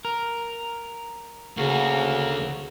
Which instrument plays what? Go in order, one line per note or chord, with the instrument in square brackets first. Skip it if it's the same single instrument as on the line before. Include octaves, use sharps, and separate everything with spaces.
[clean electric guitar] A#4
[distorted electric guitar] D2 [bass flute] C#3 [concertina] A#3 F#4